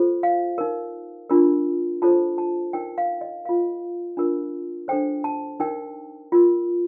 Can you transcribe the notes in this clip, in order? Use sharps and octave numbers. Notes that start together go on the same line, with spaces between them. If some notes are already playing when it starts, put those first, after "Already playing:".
Already playing: F4 A4 C5
F5
D#4 A#4
D4 F4 A#4
F4 A4 C5 A5
A5
D#4 A#4 G5
F5
D#5
F4 A#4 F5
D4 F4 A#4
D4 A4 C5 G5
A5
D#4 A#4 G5
F4 A#4